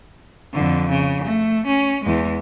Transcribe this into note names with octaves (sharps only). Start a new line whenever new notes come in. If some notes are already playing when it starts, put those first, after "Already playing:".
F2 D3
C#3
A3
C#4
E2 G#3